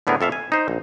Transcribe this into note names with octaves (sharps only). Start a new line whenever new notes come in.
A2 D3 B3 G#4 A#4
F2 A4 E5 F5
G#5
D#4 C5
A#1